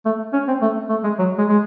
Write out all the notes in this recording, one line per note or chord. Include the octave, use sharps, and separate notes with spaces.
A3
C#4
C4
A3
A3
G#3
F#3
G#3
G#3